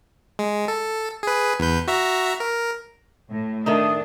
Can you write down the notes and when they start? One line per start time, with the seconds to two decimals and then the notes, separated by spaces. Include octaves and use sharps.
0.39 G#3
0.68 A4
1.23 G#4 B4
1.60 E2 B4 G6
1.88 F#4 E5 A#5
2.40 A#4
3.29 A2
3.66 D#3 A3 D4 D#4 E5 D#6